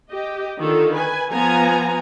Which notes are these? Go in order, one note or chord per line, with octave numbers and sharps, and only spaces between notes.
G4 D#5
D3 D#3 F4 A4
B4 G#5
F3 B3 G#5 A#5